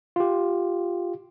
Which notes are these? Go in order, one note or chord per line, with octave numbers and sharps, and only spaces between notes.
F4 G4